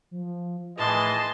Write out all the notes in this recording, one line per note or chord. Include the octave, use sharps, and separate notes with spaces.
F3
A2 D#3 E3 G#3 D#5 A5 C6